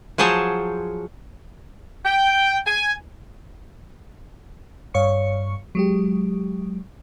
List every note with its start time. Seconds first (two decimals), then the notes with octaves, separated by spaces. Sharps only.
0.18 F3 F#3 G#4 C5 C#5 A5
2.05 G5
2.67 G#5
4.94 G2 C#5 F5 C#6 C#7
5.75 F#3 G#3 G4